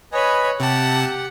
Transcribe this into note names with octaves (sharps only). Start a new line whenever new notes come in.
B4 C#5 D#5 G#5 B5
C3 G4 F#5 A5